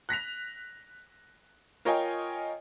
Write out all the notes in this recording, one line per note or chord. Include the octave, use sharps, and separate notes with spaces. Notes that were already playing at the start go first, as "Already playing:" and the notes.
F#6 A#6 B6 F7
F4 A#4 C#5 D#5 G5 G#5